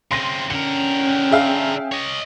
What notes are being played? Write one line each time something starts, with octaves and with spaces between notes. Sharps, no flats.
C#3 C4 C6 A#6 D#7
D3 C#4 A#4 G5 C#7
G#4 E5 F5
C#5 D#5